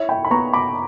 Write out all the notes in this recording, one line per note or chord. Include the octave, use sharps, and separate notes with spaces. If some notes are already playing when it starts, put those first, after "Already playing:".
Already playing: E4 C#5 E5
G5 B5
B5
B3 A#5 C#6
B5 D6